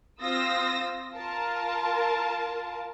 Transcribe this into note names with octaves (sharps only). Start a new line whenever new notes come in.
C4 F4 D#6 E6 A#6
F4 A#4 A5